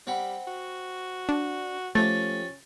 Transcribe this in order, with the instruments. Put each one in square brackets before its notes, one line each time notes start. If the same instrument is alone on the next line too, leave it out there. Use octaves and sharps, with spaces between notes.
[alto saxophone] G3 [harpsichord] C4 F#5 B5
[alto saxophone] F#4
[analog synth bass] D4
[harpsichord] F3 G4 [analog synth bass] A3 [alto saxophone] C#4 [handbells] A6